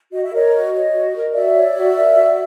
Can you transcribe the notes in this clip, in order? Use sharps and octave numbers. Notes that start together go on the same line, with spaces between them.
F#4 D#5
E5
A#4 C#5 D#5
F#4
C#5
F#4
A#4
F#4 D5 E5
C#5
F#4
A#4
F#4